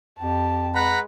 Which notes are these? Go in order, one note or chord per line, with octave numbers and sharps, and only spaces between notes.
F2 G4 A5
G#3 B4 F#5 A#5 B5